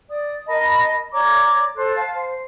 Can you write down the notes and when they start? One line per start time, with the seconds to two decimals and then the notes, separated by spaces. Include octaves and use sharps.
0.09 D5 D#6
0.47 A#4 D#5 A5 B5
1.12 C#5 D5 A#5 D6
1.75 A4 C5 F#6
1.96 F5 A5
2.13 C5